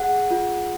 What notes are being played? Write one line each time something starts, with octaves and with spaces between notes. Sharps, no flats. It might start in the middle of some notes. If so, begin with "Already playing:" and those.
Already playing: G#4 F#5
F4